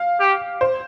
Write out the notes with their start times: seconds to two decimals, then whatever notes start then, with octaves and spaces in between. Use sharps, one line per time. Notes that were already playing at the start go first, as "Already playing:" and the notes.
Already playing: F5
0.20 G4
0.61 C5